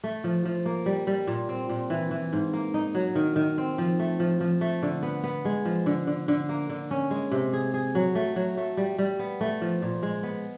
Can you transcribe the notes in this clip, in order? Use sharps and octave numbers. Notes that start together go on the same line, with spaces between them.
A3
F3
F3
A#3
G3
G3
A#2
C4
A#2
E3
E3
G#2
A#3
D#4
F#3
D#3
D#3
C4
F3
A3
F3
F3
A3
D3
B3
B3
G#3
F3
D3
D3
D3
A#3
D3
C#4
G#3
C3
G#4
G#4
F#3
A3
F#3
A3
G3
G3
B3
A3
F3
A#2
G#3
B3